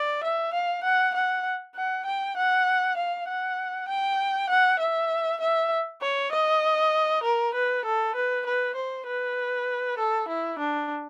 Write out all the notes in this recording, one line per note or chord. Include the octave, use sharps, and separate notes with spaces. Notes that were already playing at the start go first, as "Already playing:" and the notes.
Already playing: D5
E5
F5
F#5
F#5
F#5
G5
F#5
F5
F#5
G5
F#5
E5
E5
C#5
D#5
A#4
B4
A4
B4
B4
C5
B4
A4
E4
D4